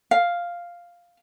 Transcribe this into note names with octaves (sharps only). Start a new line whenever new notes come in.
F5